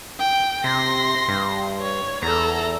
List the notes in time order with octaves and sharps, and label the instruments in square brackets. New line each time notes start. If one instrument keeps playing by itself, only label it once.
[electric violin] G5
[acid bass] C3 [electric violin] C6 A#6
[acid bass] G2
[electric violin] C#5
[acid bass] E2 [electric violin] A4 A#5